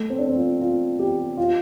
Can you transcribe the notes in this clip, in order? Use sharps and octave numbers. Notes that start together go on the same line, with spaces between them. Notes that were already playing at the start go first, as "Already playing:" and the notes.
Already playing: A3
C4
D4
C4
F4
F4
G4
F4